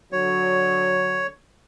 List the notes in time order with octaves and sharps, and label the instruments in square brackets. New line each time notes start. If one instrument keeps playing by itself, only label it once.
[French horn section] D3 F#3 [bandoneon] C#5